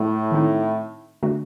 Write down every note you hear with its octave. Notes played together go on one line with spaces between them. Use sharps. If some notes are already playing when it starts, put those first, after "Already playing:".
Already playing: A2
D#3 A3 C4 D#4
D3 A3 D4 F#4